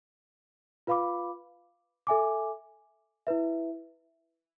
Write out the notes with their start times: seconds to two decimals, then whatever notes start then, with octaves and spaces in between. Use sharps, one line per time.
0.87 F4 B4 F5 B5 D6
2.07 A4 E5 G#5 D6
3.27 E4 B4 E5